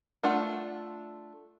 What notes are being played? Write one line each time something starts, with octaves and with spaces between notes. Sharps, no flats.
A3 D4 F4 F#5